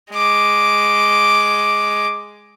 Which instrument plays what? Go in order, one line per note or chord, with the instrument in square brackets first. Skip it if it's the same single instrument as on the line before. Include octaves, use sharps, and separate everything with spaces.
[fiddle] G#3 D6